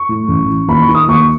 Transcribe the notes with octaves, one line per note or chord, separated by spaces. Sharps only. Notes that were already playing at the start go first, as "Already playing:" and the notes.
Already playing: C#6
A2
A1
E3
D#2 B5
C#6
D#3
D#6
D#2 C#6